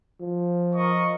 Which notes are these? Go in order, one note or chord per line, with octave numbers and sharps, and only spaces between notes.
F3
A#4 D#5 C#6